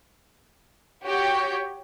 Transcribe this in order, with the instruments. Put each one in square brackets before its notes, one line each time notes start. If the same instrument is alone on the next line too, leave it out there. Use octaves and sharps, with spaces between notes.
[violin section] F#4 G4 C#5 G5